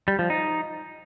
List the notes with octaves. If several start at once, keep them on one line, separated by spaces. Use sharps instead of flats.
G3
F3
D#4